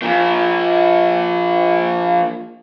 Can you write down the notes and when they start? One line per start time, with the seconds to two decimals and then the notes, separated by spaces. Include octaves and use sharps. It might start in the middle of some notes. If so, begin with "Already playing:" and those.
0.02 F3 A#3